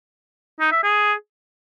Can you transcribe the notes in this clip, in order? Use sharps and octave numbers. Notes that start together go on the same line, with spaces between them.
D#4
E5
G#4